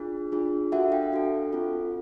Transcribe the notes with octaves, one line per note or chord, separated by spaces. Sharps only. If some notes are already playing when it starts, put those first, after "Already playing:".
Already playing: D4 F4 G#4
D4 F4 G#4
D4 F#4 A4 E5 F#5
F5 G5
D4 F#4 A4
C4 F4 A4